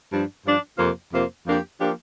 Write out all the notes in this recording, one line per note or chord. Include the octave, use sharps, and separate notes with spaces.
G2 F3 D4
G2 F3 D4
F2 C3 A#3 F4 C5
F2 C3 A#3 F4 C5
F2 F3 A#3 D4 G4
F3 A#3 D4 G4